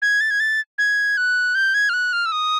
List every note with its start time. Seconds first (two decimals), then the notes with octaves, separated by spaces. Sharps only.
0.02 G#6
0.21 A6
0.31 G#6
0.40 A6
0.78 G#6
1.17 F#6
1.55 G6
1.74 G#6
1.89 F6
1.94 F#6
2.13 F6
2.26 E6
2.32 D#6